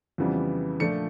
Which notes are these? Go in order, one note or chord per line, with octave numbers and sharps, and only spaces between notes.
F2 C#3 E3 G3 B3
A#2 F3 A3 D4 C#7